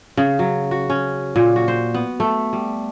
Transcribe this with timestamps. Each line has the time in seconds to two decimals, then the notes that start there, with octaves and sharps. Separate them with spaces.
0.17 C#3
0.39 F#3
0.71 F#4
0.90 C#4
1.36 A#2
1.56 F#4
1.68 C5
1.94 B3
2.20 A3
2.53 G3